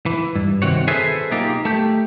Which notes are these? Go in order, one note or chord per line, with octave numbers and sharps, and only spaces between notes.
E3
G2
C3 D#3 C4 F#4 C#5
G#4 A4 B4 C5 E5 G#5
B1 A#3 D#4 F4 G4
A3 G4